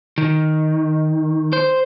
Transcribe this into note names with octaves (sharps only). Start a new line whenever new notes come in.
D#3
C5